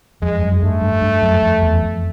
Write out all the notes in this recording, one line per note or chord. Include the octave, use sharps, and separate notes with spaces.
F2 G#3
F#2
G2 A3
G2
G2
F#2
F2
E2
F2